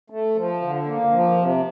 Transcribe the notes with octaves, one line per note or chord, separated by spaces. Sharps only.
A3
F3
D3
A#3
F3
C3